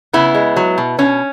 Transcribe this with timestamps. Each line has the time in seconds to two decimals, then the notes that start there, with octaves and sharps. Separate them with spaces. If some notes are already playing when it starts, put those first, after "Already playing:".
0.13 C#3 B3 E4
0.34 G#3
0.56 F#3
0.78 B2
0.99 B2 C#4